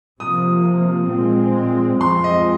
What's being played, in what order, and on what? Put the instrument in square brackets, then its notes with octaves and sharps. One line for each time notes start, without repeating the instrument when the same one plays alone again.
[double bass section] C3 F3 A#3 [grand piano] D#6
[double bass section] A#2 F3 G#3 C4
[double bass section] F2 F3 G#3 C4 [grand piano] C6
[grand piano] D#5